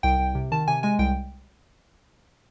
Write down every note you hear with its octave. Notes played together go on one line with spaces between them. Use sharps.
C2 G5
C2
C3
D#3 A5
C3 G#5
G#3 G#5
C2 G5